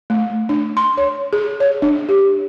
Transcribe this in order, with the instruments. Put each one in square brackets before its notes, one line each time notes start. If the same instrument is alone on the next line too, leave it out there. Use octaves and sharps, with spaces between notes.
[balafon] A3
D4
C6
C#5
G#4
C#5
D4
G4